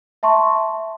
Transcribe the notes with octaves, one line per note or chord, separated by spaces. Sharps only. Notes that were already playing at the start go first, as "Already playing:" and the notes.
E5 A5 C6 C#6